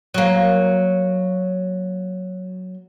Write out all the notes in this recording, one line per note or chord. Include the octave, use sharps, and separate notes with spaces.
F#3 A#3